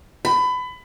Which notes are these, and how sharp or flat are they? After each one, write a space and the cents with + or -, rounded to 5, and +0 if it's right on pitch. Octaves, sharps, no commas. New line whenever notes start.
B5 +25